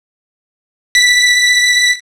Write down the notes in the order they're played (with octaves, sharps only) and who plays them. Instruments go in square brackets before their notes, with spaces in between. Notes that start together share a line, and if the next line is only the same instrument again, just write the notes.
[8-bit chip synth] B6